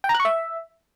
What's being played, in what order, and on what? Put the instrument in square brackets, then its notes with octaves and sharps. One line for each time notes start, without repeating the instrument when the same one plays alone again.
[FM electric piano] G5
A#5
F#6
C#6
E5